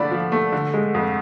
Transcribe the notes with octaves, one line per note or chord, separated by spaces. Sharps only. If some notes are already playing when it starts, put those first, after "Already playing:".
Already playing: D3 F3 A3 D4 D5 B5
F3
A3
D3
G#3
F2